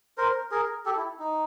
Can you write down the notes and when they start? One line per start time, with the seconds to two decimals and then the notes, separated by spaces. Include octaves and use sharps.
0.18 A#4 C5
0.51 G#4 A#4
0.86 G4 A4
0.97 E4
1.20 D#4